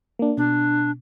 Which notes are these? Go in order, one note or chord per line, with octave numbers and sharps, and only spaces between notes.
A#3 D4
B2 D4